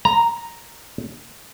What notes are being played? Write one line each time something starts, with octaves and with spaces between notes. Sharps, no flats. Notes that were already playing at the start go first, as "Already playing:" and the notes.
A#5